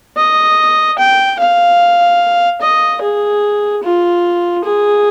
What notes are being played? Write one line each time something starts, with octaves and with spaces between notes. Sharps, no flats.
D#5
G5
F5
D#5
G#4
F4
G#4